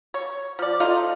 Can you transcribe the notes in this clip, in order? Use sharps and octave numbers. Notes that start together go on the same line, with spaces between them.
C#5
F3 D5
A3 D#4 F4 D#5